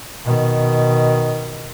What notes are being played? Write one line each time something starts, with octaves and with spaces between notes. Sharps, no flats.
B2 D#3